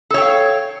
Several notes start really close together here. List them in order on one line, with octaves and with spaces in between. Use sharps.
A4 C#5 G5 F5